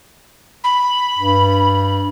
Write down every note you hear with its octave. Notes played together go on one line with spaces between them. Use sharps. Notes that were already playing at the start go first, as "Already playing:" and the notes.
B5
G2